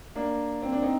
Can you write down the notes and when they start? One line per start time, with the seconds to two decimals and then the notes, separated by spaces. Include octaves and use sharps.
0.15 A#3 D4
0.62 C4
0.72 D4
0.82 C4 D#4